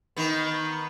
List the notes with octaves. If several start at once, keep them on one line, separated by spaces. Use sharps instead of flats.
D#3 B3